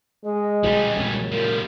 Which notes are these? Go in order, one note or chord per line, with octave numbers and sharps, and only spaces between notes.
G#3 D#5
B1 A#2 G3 C#4
F#2 A#2 C#3 G#3
F3 G3 A#4